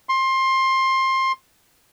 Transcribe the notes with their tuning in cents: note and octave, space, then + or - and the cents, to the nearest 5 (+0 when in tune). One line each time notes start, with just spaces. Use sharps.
C6 +20